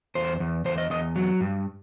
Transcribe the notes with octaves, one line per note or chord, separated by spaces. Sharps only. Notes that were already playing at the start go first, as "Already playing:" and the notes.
E2 C5
E2
E2 C5
D#5
E2 D#5
F#3
G2